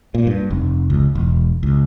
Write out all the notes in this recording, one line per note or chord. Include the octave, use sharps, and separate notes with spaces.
A#2
G2
F1
C#2
E1
C#2